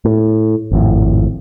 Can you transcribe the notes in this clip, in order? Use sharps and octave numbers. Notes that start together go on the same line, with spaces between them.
A2
G#1 F2 A2